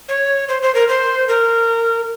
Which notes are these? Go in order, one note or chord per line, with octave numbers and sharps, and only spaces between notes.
C#5
C5
C5
A#4
C5
A#4